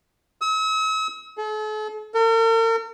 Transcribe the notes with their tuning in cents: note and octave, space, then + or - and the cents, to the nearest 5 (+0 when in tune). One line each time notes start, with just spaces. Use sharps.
E6 -45
A4 -45
A#4 -45